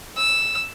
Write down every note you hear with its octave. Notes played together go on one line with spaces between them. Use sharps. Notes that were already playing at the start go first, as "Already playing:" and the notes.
E6